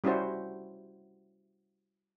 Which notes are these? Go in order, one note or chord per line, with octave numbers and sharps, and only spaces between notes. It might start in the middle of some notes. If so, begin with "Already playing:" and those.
G3 C#4 E4 F#4 C5